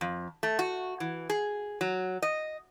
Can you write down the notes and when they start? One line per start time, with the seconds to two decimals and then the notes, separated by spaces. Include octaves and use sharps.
0.01 F2
0.43 A3
0.59 F#4
1.00 E3
1.30 G#4
1.81 F#3
2.22 D#5